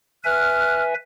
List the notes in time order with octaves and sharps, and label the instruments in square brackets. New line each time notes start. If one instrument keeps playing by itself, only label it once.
[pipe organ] B4 E5 G#5 [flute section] F6 F#6